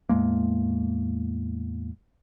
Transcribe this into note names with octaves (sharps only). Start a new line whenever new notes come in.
E2 A2 G#3 A#3